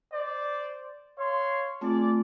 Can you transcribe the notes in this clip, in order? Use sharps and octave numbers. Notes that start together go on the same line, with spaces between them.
C5 D5
C#5 F5 C6
A3 C4 F4 G#4 D5